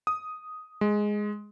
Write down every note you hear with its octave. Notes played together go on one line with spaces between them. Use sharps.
D#6
G#3